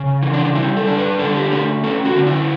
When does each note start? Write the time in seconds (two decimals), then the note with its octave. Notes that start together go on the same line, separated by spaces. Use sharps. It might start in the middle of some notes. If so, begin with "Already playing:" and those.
Already playing: C#3
0.23 E3
0.33 D4
0.55 G3 E4
0.76 A4
0.87 D4
0.98 B4
1.19 D3 A4
1.36 G4
1.52 A3 G4
1.84 C#4 A4
2.05 F#4
2.15 D3
2.26 E4